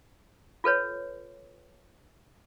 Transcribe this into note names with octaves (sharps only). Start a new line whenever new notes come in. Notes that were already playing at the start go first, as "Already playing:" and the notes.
F4 A4 B4 C#5